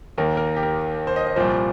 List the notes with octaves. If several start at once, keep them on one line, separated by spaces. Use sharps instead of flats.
D#2 D#3 A#3 A#4
A#4
G4
A#4
C5
D#5
D#5
C2 A#2 F3 C5